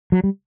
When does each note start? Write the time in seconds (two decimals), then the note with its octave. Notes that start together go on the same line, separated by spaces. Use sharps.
0.12 F#3
0.24 G3